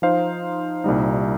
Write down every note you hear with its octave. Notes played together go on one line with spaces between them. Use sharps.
F3 D#4 C5 F5
C2 A#2 G3 D#4